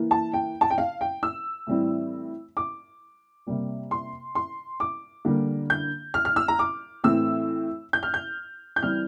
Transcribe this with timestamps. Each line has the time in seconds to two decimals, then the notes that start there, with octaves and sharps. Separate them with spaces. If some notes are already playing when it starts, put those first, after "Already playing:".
Already playing: E3 A#3
0.11 A5
0.33 G5
0.61 A5
0.70 G5
0.78 F5
1.01 G5
1.23 E6
1.67 A2 E3 G3 C4
2.57 D6
3.47 C3 G3 A#3
3.91 C6
4.35 C6
4.80 D6
5.25 D3 G3 A#3
5.70 G6
6.14 F6
6.25 F6
6.36 E6
6.48 A#5
6.59 D6
7.04 A2 E3 A3 C4 E6
7.93 G6
8.03 F6
8.14 G6
8.76 G6
8.82 E3 G3 C4 F6